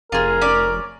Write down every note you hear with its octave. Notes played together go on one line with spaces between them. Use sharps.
F1 F4 G#4 A#4
C#4 D5